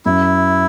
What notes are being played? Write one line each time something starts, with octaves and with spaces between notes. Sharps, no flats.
F#2 E4